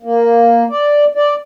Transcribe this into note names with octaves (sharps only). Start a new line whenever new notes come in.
A#3
D5
D5